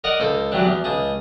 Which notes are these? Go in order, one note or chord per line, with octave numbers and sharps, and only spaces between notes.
A#4 D5 D#5 F#5
C#2 A4 C5
E3 F#3 G3 D4
E2
C#2 G#4 A5